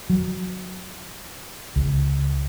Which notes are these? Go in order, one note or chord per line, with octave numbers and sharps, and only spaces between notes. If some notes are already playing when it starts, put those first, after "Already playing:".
F#3
C#2